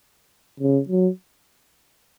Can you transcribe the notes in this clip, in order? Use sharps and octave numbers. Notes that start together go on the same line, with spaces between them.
C#3
F#3